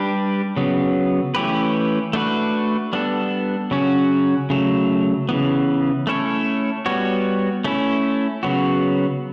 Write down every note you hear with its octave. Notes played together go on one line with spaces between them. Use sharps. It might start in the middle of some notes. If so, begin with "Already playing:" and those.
Already playing: G3 D4 G4 B4
C#3 F#3 B3
E3 A3 C#4 G4 B4
A3 D4 F#4 B4
G3 B3 D4 A4
C#3 F#3 C#4 F#4
C#3 F#3 A3
C#3 E3 B3
A3 C#4 E4 A4 C#5
G3 B3 F#4 C#5
A3 C#4 E4
C#3 F#3 B3 F#4